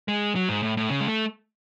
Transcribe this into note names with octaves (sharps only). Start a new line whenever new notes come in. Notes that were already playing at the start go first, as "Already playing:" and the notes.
G#3
F#3
G#2
A2
A2
C#3
G#3
A3